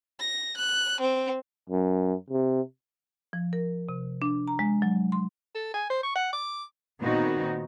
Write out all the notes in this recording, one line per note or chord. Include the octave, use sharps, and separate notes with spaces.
A#6
F#6
C4
F#2
C3
F3
A#4
C3
D4
A#5
G#3
F#3
C6
A4
G#5
C5
C#6
F#5
D6
A#2 D#3 B3 C4 D#4 F#4